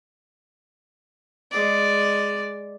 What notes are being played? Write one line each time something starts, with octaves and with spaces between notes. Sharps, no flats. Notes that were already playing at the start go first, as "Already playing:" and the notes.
G#3 D5